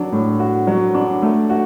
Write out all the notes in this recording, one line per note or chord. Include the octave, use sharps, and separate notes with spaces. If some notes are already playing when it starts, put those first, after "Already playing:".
Already playing: F#3 D4
A2
F#4
F#3
D4
A3
F#4